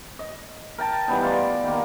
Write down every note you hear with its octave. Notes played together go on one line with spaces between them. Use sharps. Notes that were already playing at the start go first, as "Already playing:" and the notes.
D#5
A#4 G5 A5
E3 G3 B3 D#4
F4 D5
D#3 A#3